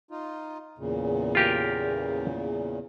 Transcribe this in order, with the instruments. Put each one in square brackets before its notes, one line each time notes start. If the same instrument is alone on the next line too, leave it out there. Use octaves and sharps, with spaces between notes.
[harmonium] D#4 F4
E2 A#2 C#3
[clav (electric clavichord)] F4 G4 A#4